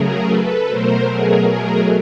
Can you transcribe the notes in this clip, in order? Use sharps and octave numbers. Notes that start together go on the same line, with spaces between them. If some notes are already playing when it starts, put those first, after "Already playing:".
Already playing: C#3 F#3 A3 G#4 A#4
A4 B4
B2 F#3 A3 A#4 C5
G#4 A#4
G#4 A#4